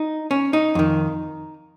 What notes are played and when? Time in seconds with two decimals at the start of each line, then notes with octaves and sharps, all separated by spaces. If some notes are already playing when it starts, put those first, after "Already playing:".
Already playing: D#4
0.31 C#4
0.53 D#4
0.75 F2 D#3